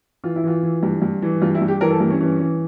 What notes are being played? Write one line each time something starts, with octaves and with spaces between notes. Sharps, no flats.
E3 F4
E4
E3 F4
E3
G2
G2
E3
G2 F4
E4
G2
G4
E3 A#4
A4
G2 A#3
C#4
E3 C#4
E3